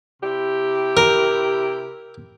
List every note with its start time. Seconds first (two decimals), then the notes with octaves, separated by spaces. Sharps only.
0.22 C3 E4 G4
0.97 A#4